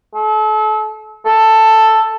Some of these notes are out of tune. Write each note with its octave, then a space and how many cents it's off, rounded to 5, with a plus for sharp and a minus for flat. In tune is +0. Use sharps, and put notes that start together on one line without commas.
A4 -35
A4 +5